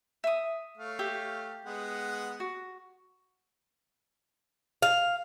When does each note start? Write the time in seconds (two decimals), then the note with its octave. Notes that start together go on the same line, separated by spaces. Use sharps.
0.24 E5 D#6
0.78 A3 C#5 F5
0.99 G4 E5
1.65 G#3 B3 F#5
2.40 F#4
4.82 F5